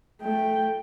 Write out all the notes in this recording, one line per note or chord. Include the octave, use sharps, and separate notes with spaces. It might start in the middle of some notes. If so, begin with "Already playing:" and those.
A3 G5